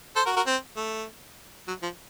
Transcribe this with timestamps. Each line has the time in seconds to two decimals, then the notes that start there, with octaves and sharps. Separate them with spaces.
0.16 A4 C5
0.26 F#4 A#4
0.36 F#4 A#4
0.47 C4
0.76 A3
1.68 F#3
1.82 F3